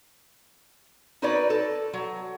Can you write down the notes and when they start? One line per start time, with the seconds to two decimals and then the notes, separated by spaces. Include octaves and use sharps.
1.22 D#4 F#4 A#4 B4 C#5 D5
1.50 A4
1.93 F#3